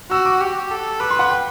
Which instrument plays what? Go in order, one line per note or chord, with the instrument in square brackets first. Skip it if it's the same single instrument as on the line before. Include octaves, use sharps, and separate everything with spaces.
[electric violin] F#4 [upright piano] E6
[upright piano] D6
[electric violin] G4
A4
[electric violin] B4 [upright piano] D6
[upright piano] C6
F#5
G5